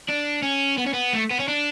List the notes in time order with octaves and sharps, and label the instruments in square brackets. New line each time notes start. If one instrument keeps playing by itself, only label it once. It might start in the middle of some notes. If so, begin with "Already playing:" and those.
[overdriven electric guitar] D4
C#4
B3
C#4
B3
A3
B3
C#4
D4